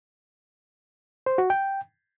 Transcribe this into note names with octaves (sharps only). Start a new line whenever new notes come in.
C5
F#4
G5